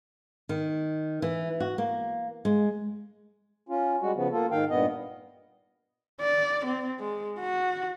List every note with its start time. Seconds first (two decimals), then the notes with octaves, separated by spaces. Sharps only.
0.49 D#3
1.22 E3
1.60 F#4
1.78 A#3
2.45 G#3
3.69 C#4 F4
4.02 G3 G#3 F#4
4.15 C#3 F3 B3
4.32 A#3 F4 A4
4.51 G#2 D#3 F5 G5
4.70 G2 A#2 B3 D#5
6.21 D5
6.65 C4
7.00 G#3
7.39 F#4